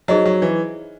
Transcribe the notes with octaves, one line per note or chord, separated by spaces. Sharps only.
F#3 D#4 G#4 C5 D#5
F#3
E3